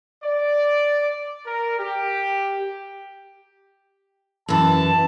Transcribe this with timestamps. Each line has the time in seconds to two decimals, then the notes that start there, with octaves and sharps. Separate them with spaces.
0.24 D5
1.46 A#4
1.80 G4
4.48 F#2 E3 A5